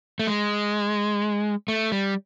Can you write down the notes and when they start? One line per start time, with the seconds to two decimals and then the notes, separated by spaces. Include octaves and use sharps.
0.19 A3
0.27 G#3
1.68 A3
1.92 G3